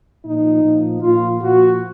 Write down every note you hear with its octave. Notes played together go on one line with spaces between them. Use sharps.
A#2 F3 D#4
A#2 F3
A#2 F3 F4
A#2 F3 F#4